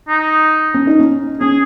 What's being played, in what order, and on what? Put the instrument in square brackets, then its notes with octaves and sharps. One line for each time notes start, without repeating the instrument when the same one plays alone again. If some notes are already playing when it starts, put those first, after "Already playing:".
[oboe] D#4
[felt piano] C#4
D#4
C#4
[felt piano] C#4 [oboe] G#4